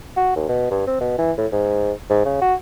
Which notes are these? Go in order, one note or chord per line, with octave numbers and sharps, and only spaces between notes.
F#4
D#2
B2
G2
C4
B2
E3
A2
G#2
G#2
C#3
F#4